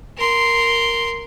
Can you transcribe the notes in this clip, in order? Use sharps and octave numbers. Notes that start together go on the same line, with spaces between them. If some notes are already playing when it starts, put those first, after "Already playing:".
A#4 C6